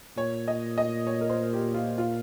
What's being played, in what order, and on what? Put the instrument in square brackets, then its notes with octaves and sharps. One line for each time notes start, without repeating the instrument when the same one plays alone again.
[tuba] A#2 [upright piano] C#5
[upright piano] D#5
D#5
C#5
A#4
C5
G4
F4
F4